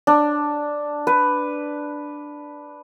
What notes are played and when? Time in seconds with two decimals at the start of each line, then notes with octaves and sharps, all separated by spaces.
0.07 D4
1.07 B4